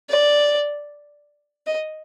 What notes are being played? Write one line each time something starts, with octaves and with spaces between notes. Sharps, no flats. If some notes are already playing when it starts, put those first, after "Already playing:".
D5
D#5